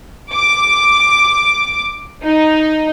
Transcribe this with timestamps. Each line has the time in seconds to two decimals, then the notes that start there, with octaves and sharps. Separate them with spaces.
0.34 D6
2.25 D#4